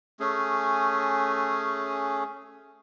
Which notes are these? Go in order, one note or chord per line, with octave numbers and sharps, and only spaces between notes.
A3 C#4 G#4